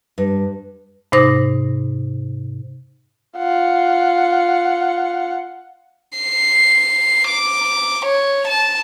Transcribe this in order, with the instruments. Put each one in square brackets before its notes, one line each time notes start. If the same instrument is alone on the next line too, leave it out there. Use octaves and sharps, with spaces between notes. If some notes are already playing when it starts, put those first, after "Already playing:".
[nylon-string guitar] G2
[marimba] G#2 C3 D#4 C5 D6 A#6
[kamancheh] F4 F#5
[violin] C7
D6
C#5
A5